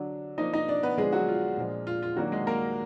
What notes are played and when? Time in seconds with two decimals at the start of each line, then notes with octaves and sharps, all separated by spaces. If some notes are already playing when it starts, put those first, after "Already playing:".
Already playing: D3 F#3 D4
0.38 F3 A#3 D4 D#4 D#5
0.53 D#4 D#5
0.68 D4 D5
0.83 B3 B4
0.97 D3 F3 G#3 B3 D4 G#4
1.12 F#3 F#4
1.28 F4
1.57 A#2 F3 G#3 D4
1.87 F4
2.02 F4
2.17 D#3 F#3 A#3 D4 F#4
2.32 G#3 G#4
2.47 A#3 A#4